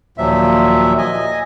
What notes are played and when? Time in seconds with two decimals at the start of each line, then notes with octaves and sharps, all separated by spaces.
0.18 D#2 A#2 F3 F#3 E5
0.98 D#5 G#5